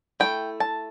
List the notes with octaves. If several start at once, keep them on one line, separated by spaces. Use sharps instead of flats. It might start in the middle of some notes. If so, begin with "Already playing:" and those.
A3 E4 G5
A5